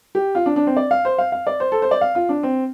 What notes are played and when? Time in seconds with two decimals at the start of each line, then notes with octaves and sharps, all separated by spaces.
0.15 G4
0.35 F4
0.46 D4
0.56 D4
0.67 C4
0.77 D5
0.91 F5
1.05 C5
1.18 F5
1.32 F5
1.47 D5
1.60 C5
1.72 A4
1.82 C5
1.91 D5
2.01 F5
2.15 F4
2.29 D4
2.43 C4